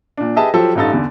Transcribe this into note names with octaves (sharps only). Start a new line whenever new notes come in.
A#2 D4
G4 G#4 B4 D#5 E5 A5
F3 F#3 G4 A4 C5
A1 G2 D#4 A4 A6
E2 D3